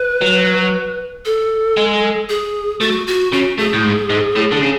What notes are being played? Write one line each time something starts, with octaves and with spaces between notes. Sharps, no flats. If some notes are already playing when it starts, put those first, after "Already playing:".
Already playing: B4
F#3
A4
G#3
G#4
A3 F#4
F#4
C#3 F#4
A2 G#4
A2
G#2
G#2
A2
D3
C#3